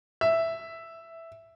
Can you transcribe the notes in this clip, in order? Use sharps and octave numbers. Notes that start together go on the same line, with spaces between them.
E5